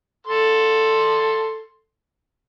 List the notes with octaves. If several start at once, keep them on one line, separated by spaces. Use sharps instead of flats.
A4 C6